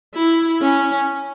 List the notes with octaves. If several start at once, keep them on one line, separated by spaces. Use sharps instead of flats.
E4
C#4